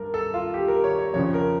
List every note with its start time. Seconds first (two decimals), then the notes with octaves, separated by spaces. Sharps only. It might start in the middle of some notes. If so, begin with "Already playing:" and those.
Already playing: G2 A#4
0.14 A4
0.34 F4
0.54 G4
0.68 A#4
0.84 C#5
0.99 C#5
1.14 F2 C#3 F3 C#5
1.34 A#4